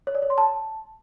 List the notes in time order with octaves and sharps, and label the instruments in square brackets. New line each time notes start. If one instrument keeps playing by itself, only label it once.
[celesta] C#5
D5
C#5
C6
A5